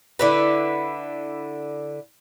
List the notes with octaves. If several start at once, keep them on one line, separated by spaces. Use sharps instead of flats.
D3 E4 B4